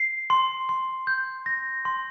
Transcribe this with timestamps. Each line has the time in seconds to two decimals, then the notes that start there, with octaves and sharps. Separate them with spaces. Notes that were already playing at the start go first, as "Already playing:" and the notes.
Already playing: C7
0.30 C6
0.69 C6
1.07 G6
1.46 A#6
1.85 C6